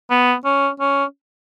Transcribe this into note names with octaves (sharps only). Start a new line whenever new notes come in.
B3
C#4
C#4